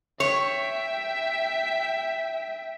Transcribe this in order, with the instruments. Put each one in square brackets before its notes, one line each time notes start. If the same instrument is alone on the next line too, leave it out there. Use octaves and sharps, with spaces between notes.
[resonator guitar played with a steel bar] C#5 [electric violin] E5 G5